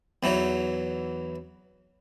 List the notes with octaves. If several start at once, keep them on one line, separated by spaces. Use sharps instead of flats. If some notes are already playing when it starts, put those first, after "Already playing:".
E2 E3 F#3 D#4